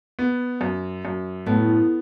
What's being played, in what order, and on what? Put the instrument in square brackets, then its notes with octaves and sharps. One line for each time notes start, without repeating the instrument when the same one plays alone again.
[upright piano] B3
F#2
F#2
[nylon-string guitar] A2 [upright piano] B3